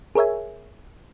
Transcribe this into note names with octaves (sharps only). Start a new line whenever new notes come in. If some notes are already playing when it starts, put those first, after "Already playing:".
G#4 A#4 C#5 E5 G#5